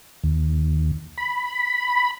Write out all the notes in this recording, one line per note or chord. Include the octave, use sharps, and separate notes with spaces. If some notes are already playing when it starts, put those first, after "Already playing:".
D#2
B5